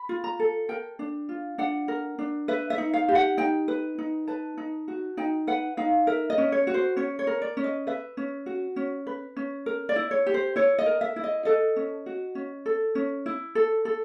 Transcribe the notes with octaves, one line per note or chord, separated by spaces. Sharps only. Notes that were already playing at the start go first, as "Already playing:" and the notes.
Already playing: B5
F4
A#5
A4
A#4 G5
D4
F4
D4 F#5
A#4
D4
B4 E5
E5
D#4
F5
G4
F#5
D#4 G5
B4
D#4
B4 A5
D#4
F#4
D#4 G5
B4 F#5
D#4 F5
A#4 E5
D#5
C#4
C#5
F#4
C5
C#4 C#5
C#5
A#4
D5
C#4
D#5
B4 E5
C#4
F#4
C#4
B4
C#4
A#4
D5
E4
C#5
G4
C5
E4 C#5
D#5
A#4
E5
E4
D#5
A4 D#5
C#4
F#4
C#4
A4
C#4
E4
A4
A4